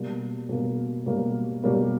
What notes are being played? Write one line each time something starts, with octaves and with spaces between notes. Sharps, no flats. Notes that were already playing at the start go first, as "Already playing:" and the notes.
Already playing: B2 G3 A#3
B2 G3 A#3
B2 G3 A#3
B2 G3 A#3